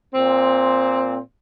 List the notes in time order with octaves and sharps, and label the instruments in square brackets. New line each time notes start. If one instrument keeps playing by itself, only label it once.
[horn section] A#2 C4